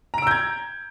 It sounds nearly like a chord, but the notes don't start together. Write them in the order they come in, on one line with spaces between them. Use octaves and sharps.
A#5 D7 E6 G6 G#6